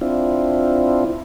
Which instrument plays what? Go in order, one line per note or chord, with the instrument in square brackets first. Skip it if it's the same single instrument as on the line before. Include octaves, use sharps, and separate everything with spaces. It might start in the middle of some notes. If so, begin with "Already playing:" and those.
[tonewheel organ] C4 D4 E4 F4